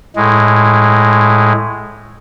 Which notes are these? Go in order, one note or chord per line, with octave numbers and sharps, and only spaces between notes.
A2 G#3